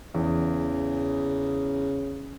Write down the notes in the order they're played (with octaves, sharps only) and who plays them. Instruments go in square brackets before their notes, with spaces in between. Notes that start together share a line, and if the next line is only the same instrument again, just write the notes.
[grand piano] E2 [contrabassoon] C#3